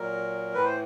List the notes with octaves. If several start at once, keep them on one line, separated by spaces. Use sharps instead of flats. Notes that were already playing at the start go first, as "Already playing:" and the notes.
Already playing: A#2 F#3 A#4
A2 E3 B4
C5